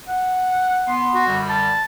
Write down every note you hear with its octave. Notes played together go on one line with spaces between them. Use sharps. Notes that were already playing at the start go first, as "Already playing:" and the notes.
F#5
B3 C6
F#4
F#2 D3 G3
A5